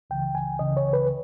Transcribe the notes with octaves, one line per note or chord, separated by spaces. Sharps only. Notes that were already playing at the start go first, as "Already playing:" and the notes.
C#2 C#3 E3 G5
G#5
C#2 C#3 E3 D#5
C#5
B4